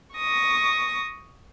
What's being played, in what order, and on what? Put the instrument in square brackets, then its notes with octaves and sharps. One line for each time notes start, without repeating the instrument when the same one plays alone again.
[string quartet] C#6 D#6 A#6